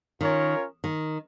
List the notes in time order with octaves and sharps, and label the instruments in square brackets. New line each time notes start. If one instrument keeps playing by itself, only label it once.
[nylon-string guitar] D#3 [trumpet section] C#4 F4 A#4 C#5
[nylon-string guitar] D#3